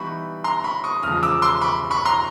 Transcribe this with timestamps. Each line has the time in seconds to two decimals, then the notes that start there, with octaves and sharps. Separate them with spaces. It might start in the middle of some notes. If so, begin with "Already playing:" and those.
Already playing: E3 G3 B3 D#4 B5 C#6
0.44 A#5 C6
0.64 B5 C#6
0.84 C#6 D#6
1.03 E2 C#3 F3 G#3 D#6 F6
1.23 D6 E6
1.42 C6 D6
1.61 B5 C#6
1.90 B5 C#6
2.05 A#5 C6